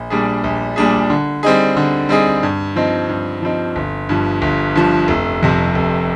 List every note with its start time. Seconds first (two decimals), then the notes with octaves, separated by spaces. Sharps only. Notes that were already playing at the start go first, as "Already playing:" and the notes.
Already playing: A#1
0.10 A#2 G3 D4 G#4
0.44 A#1
0.76 A#2 G3 D4 G#4
1.10 D3
1.43 G3 C4 D#4 G#4
1.77 D3
2.09 G3 C4 D#4 G#4
2.43 G2
2.76 F3 C4 D#4
3.09 G2
3.42 F3 C4 D#4
3.76 G1
4.09 G2 F3
4.42 G1
4.75 G2 F3
5.08 F1
5.42 F2 C3
5.75 F1